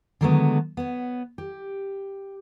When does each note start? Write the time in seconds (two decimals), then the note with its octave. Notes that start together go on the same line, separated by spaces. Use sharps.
0.21 D3 D#3 F#3 G#3 A3 B3
0.77 B3 C#5
1.38 G4